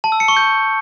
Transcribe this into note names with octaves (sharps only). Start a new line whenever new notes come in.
A5
E6
C#7
C#6
G6